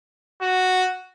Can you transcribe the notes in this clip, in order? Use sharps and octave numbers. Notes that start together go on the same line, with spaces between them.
F#4